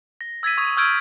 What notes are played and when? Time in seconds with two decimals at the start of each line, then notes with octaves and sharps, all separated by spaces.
0.21 A#6
0.43 E6 G#6 A6 B6 D#7
0.58 C#6 D#6 G#6
0.77 C#6 E6 F6 G6 G#6 D7